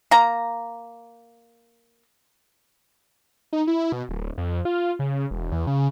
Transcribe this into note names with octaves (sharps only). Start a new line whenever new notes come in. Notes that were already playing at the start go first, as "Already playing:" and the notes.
A#3 A#5
D#4
E4
B2
D1
F2
F4
C#3
E1
E2
C#3